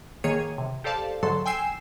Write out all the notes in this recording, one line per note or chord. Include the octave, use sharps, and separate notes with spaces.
D#3 A#3 G#4 C#5 G#6 D#7
C3
G4 A4 C5 D5 F5 A5
G#2 D3 F#3 A4 C6
G5 G#5 E6 C7 E7